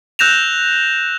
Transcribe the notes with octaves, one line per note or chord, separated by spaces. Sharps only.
E6 F#6 G6 A#6 E7 F7